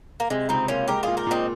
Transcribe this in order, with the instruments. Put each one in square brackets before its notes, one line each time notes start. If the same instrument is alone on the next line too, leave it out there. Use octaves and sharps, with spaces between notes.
[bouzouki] A#3
[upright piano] C3 [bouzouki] G#3
[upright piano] C#2 [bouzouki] C4 D#4
[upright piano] A#3 [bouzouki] C#4 F4
[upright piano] G#3 [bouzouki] G4 A#4
[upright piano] A#2 [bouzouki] F4 G#4
[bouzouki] G4 A#4
[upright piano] A#2 [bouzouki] C4 D#4